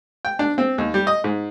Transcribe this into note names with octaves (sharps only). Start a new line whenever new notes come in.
G5
D4
C4
D#2
G3
D#5
G#2